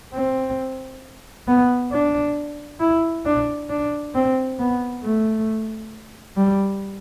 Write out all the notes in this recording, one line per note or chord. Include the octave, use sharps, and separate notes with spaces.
C4
B3
D4
E4
D4
D4
C4
B3
A3
G3